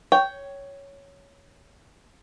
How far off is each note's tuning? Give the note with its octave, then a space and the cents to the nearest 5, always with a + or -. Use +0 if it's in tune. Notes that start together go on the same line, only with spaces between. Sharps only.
C#5 +5 G5 -10